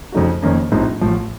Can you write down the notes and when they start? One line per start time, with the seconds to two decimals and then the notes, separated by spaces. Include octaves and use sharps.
0.12 F2 C#3 A3 D#4 F#4
0.42 F#1 F2 D#3 A#3 C#4
0.72 A#1 A2 F3 C4 D#4
1.01 A1 A2 F3